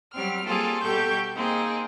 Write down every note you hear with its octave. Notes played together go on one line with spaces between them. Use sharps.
F#3 G3 C4 F6
G3 A#3 C4 F4 G#4 A4
B2 G3 G4 A4 C#6 G6
A#3 C4 D#4 G#4